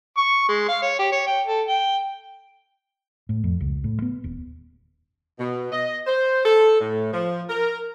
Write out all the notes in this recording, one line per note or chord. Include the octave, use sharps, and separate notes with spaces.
C#6
G#3
F5
C#5
G4
C#5
G5
A4
G5
A2
F2
C#2
A2
B3
D#1
B2
D#5
C5
A4
A2
F3
A#4